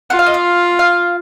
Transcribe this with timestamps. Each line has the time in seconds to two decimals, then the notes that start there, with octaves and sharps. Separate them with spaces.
0.10 F4 F#5
0.19 F5
0.26 D#5
0.34 F5
0.79 F5